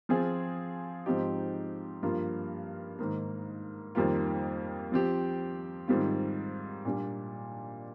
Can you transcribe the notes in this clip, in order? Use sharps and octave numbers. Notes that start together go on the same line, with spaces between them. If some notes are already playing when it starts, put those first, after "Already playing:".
F3 C4 F4 G#4
G#2 F3 C4 D#4 G4
G2 F3 A#3 F4
G#2 D#3 A#3
F2 D#3 G3 A#3 F4
F3 C4 G4
G#2 D#3 G3 C4 F4
A#2 G3 D4